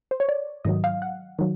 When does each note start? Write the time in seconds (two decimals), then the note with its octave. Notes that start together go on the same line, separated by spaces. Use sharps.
0.11 C5
0.20 C#5
0.29 D5
0.65 G#2 D#3 F#3 D#5
0.84 F5
1.02 F#5
1.39 D#3 F#3